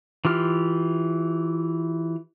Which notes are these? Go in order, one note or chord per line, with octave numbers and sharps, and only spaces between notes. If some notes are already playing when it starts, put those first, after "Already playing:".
E3 F4 G4 F6